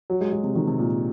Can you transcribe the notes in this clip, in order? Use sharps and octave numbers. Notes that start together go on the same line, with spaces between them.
F#3
G#3
G#3
C3
D#3
C3
A#2